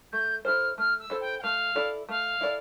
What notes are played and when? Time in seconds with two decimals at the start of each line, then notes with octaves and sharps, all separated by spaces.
0.13 A3 G6
0.45 E4 A4 C5 F6
0.78 A3 F6
1.00 E6
1.10 E4 A4 C5
1.21 G5
1.39 G5
1.43 A3 F5
1.75 E4 A4 D5
2.09 A3 F5
2.41 E4 A4 D5